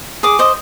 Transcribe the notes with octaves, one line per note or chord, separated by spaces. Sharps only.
G#4 D6
C5 D#5